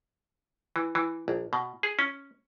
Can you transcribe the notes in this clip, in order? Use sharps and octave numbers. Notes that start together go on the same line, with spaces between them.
E3
E3
A#1
B2
G#4
C#4